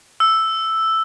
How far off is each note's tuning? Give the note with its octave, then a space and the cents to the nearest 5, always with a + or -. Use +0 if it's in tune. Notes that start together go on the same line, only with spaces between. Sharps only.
E6 +0